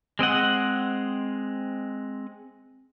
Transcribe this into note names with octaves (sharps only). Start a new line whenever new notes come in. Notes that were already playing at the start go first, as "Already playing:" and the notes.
G#3 C4 D#5 F#5